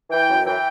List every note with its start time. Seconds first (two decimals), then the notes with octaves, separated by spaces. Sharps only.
0.10 E3 G5
0.28 F#2
0.46 E3 G5